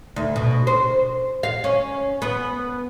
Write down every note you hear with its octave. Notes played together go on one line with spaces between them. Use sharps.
D2
B2
C5
F5
C#4
B3